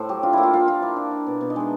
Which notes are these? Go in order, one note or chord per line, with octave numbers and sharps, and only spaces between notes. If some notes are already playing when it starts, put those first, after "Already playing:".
Already playing: A2 A3 C5
F#3 G4
D4 F4
A#3 E4
F4
A#3 F4
A#3 F4
D4 E4
D4
D4
B2
B2 D4
D#4
G#3 D4